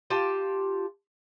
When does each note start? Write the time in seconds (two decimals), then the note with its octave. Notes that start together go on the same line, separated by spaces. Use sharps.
0.10 F4 G4 A5